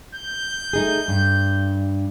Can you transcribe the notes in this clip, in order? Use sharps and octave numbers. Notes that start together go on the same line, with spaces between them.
G6
A3 D#4 G#4
G2